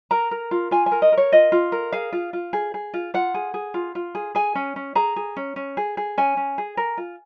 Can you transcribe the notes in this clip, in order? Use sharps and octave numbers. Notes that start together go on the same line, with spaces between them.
A#4 A#5
A#4
F4
F4 G#5
G#5
A#4
D#5
A#4
C#5
F4 D#5
F4
A#4
G#4 F5
F4
F4
G#4
G#4
F4
F4 F#5
G#4
G#4
F4
F4
G#4
G#4 G#5
C#4
C#4
G#4 A#5
G#4
C#4
C#4
G#4
G#4
C#4 G#5
C#4
G#4
A#4
F4